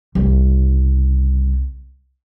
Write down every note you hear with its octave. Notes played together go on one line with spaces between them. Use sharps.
C2 C#3